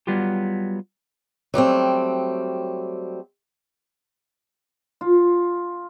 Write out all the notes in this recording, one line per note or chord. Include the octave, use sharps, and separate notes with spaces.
F#3 G3 B3 F4 G4
F#3 G3 A3 C4
F4